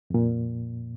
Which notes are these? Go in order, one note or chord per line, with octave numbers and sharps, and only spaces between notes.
F2 A#2